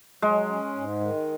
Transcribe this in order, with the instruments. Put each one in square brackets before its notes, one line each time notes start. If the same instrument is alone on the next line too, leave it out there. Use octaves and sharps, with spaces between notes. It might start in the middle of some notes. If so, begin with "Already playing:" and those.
[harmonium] F#3 [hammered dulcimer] G#3
[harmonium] C#4
G#2
D#3